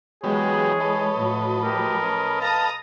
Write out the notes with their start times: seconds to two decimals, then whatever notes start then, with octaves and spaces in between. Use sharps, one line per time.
0.24 E3 F#3 G#3 B3 G4 G#4 C#5
0.80 A4 B4 D#5
1.16 A2 F3 F#3
1.64 G4 A#4
2.02 C#4
2.41 F5 A5 A#5 D#6